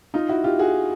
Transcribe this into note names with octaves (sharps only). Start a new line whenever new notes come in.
D#4 F4
E4 F#4
F4 G4
F#4 G#4